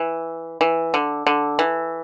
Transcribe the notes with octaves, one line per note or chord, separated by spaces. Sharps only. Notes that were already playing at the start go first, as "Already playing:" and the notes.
Already playing: E3
E3
D3
D3
E3